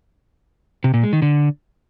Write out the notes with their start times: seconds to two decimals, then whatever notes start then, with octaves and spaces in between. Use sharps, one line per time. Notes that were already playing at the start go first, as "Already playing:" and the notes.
0.84 C3
0.94 A#2
1.03 G#3
1.13 D#3
1.22 D3